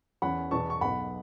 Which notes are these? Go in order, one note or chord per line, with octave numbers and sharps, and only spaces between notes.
E2 E3 C#4 F#5 B5
E2 B2 B3 A5 C#6
C#6
B1 B2 B3 F#5 B5